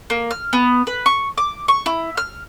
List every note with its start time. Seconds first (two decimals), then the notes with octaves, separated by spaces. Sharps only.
0.10 A#3
0.31 F6
0.53 B3
0.87 B4
1.06 C#6
1.38 D6
1.68 C#6
1.86 E4
2.17 F6